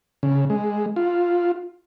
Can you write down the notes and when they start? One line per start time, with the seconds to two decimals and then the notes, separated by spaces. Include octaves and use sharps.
0.23 C#3
0.50 G#3
0.96 F4